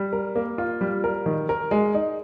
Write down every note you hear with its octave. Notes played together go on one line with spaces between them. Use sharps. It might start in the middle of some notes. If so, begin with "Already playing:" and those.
Already playing: G3
A#4
A#3
F4
G3
A#4
D#3
A#4
G#3
D#4